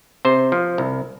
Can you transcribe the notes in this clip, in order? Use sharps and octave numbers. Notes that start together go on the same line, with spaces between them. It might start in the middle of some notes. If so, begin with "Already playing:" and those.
C3 C5
F3
C2